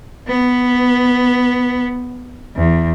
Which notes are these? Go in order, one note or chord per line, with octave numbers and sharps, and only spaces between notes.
B3
E2